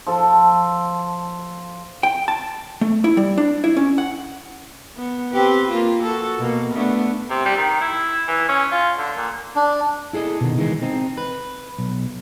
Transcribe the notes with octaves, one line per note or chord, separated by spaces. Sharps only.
F3 A4
G5
A5
A3
E4
G3
D4
E4
C#4
F#5
B3
C4 G4 B4
A#3 F4
F#4 A4
B2 A#3
A3 B3 D4
C3
G3
D#3
E4
E3
C#4
F4
D3
A#2
D4
E4 G#4 A4 D#5
B2 D#3
D#3 E3 G#3
C4 D#4
B4
B1